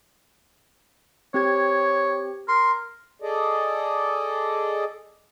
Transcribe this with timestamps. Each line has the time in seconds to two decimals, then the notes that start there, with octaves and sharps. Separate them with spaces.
1.34 C4 G4 C#5 G#6
2.48 A#4 C6
3.22 G#4 A4 D5 D#5